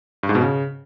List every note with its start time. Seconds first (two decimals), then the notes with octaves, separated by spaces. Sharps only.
0.23 G2
0.29 G#2
0.35 B2
0.41 C#3